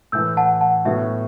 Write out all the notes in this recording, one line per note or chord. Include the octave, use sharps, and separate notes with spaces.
A2 E3 A3 E6 G6
F#5 A5
F#5 A5
A2 F#3 B3 F#4 E5